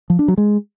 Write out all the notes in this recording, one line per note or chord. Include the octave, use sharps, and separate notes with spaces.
F3
D4
F#3
G#3